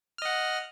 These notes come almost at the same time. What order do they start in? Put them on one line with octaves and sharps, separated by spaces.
F6 D#5 F#5